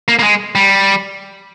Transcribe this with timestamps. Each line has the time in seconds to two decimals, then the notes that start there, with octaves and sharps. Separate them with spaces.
0.08 A#3
0.19 A#3
0.23 G#3
0.55 G3